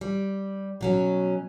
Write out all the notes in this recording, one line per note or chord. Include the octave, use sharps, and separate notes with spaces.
G3
B2 F#3 C#4